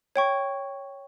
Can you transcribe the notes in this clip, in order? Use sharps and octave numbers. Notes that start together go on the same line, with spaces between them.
C#5 G5 C#6